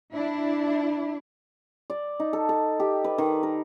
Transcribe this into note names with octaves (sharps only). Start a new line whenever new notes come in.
D4 E4
D5
D#4
A4
A4
G4
B4
D#3
A#4